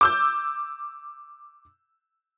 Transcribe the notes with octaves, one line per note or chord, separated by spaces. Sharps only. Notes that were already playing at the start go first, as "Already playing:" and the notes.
D6 E6 G6